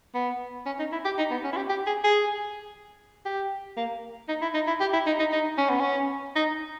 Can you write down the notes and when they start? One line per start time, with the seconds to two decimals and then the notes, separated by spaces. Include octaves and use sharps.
0.15 B3
0.66 C#4
0.79 D#4
0.92 E4
1.05 G4
1.18 D#4
1.31 B3
1.44 C#4
1.53 E4
1.57 G4
1.70 G4
1.87 G#4
2.04 G#4
3.26 G4
3.77 A#3
4.29 D#4
4.42 E4
4.54 D#4
4.68 E4
4.81 G4
4.93 E4
5.07 D#4
5.19 D#4
5.32 D#4
5.58 C#4
5.70 B3
5.80 C#4
6.36 D#4